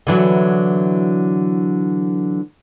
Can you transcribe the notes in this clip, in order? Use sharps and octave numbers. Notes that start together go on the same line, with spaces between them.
D3 E3 F#3